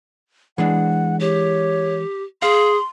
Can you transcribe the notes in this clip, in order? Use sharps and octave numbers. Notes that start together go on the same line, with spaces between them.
E3 G#3 D4 F#5
G4 C#5
G#4 F5 C6